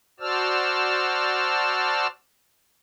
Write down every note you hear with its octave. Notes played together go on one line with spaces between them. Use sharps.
F#4 C5 D5 A5 E6 F6